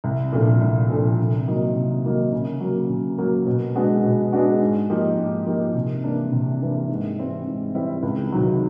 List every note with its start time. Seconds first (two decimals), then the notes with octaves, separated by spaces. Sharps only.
0.04 C2
0.32 A#2 F3 A3 D4
0.61 C2
0.89 A#2 F3 A3 D4
1.18 C3
1.47 D#3 F#3 A#3 D#4
1.75 C3
2.05 D#3 F#3 A#3 D#4
2.33 C#3
2.61 F#3 A#3
2.90 C#3
3.18 F#3 A#3
3.46 B2
3.75 G#3 B3 D4 F#4
4.04 B2
4.33 G#3 B3 D4 F#4
4.60 G#2
4.90 F3 A#3 D#4 G4
5.18 G#2
5.47 F3 A#3 D#4 G4
5.75 C3
6.04 E3 G3 A#3 D4
6.32 C3
6.61 E3 G3 A#3 D4
6.89 G#2
7.17 E3 G3 C4 E4
7.46 G#2
7.74 E3 G3 C4 E4
8.03 C#2
8.32 C3 D#3 F#3